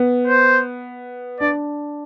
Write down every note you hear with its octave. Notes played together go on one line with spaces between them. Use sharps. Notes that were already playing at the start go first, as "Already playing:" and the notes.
Already playing: B3
C5
D4 D5